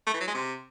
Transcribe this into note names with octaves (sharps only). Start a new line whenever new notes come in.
A3
E3
F#3
G#3
C3